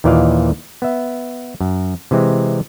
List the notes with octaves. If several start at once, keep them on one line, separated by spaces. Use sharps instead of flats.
D#2 A#2 E3 D5 D#5 F5
B3 E5
F#2
C3 E3 G#3 C4